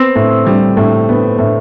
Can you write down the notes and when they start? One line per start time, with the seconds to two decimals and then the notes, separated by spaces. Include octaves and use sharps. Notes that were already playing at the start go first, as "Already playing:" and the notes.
Already playing: B3 C4
0.16 A2
0.47 G3
0.77 A2
1.09 B3
1.39 A2